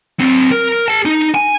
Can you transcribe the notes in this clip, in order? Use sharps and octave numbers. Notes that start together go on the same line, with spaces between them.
F#3 C4
A#4
G#4 A5
D#4
G#5